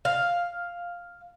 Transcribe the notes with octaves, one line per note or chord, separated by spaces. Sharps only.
F5